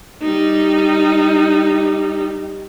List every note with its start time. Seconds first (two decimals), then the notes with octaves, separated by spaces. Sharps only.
0.22 G3 D#4